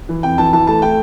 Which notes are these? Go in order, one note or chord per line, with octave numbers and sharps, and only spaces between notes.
E3
F2 G5
E3 A5
E3 A5
A3 A5
A3 G5